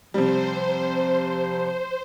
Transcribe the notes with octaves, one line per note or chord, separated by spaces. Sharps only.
C3 F3 G3 C5